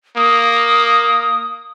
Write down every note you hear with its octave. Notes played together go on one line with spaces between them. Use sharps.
A#3 D#6